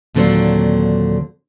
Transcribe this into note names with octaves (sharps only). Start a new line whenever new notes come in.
D#2 A#2 D3 F#3 C4 D4